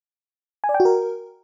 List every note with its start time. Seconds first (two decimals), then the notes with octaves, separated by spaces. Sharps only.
0.64 G#5
0.69 D5
0.74 G5
0.80 F#4
0.85 A#4